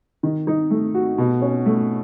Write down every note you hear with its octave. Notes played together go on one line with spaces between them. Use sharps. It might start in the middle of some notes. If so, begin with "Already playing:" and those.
D#3
D#4
A3
F#4
B2
C#4
A3